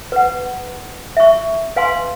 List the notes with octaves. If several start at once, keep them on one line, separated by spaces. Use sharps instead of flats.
B4 F#5
E5 C#6
B4 F5 G#5 A#5 C6